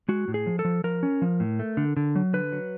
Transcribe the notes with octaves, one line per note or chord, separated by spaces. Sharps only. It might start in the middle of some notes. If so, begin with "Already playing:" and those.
G#3 F#4
A2
G#4
F3
A4
F3
F3 A#4
C#4
F3
A2
A3
D3
D3
F#3
D3 B4
F#3